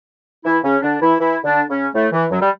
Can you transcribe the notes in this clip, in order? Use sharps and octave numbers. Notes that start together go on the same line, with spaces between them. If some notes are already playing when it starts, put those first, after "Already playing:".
E3 E4
C#3 C#4
D3 D4
E3 E4
E3 E4
D3 D4
C#3 C#4
A2 A3
E3
F#2 F#3
G3